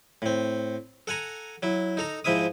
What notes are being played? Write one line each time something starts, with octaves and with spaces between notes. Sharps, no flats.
A2 C4
A4 F#5 G#5 A#5
F#3 E4
D#4 A4 A#5
G#2 F3 E4 E5 D#6